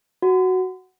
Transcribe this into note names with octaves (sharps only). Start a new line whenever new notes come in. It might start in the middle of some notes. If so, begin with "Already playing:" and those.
F#4